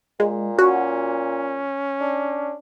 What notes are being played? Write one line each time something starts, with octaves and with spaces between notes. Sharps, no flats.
A#2 G#3
C#4 F#4
D4